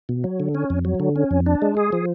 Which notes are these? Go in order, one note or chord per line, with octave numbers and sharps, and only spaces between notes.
B2
F#3
D3
C#4
F2
F#3
D3
C#4
F2
D4
G#3
G#4
F3